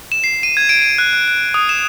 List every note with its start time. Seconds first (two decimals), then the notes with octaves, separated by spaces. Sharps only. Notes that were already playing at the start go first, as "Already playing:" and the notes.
0.12 E7
0.24 C7
0.43 D#7
0.57 G#6
0.69 D7
0.82 D#7
0.98 F#6
1.13 F#6
1.28 F#6
1.54 D#6
1.69 E7